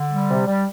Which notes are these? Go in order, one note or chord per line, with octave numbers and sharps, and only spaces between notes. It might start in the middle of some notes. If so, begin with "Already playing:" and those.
Already playing: D3
G3
C3
G3